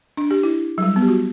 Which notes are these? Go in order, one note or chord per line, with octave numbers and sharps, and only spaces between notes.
D4
G4
E4
F#3
G3
B3
G4
F#4